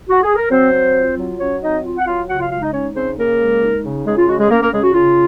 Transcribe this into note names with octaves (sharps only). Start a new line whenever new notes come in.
F#4
G#4
A#4
F#3 C4 C5
C4
F4
F#3
F#3 C#4 C#5
C4 D#4 D#5
F4
F#5
F#3 F4 F5
C#3 F#4 F#5
F4 F5
G#3 F4 F5
D#4 D#5
C#4 D#4 C#5
C#3 C4 C5
C#3 A#3 A#4
G#3
D#4
C#3
C#3 G#3 G#4
F4
G#3 F#4
G#3 G#4
A#3 C#4 A#4
A#3 A#4
C#3 G#3 G#4
F#4
C#3 F4